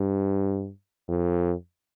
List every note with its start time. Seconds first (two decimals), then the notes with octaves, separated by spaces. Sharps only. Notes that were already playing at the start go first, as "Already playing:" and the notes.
Already playing: G2
1.08 F2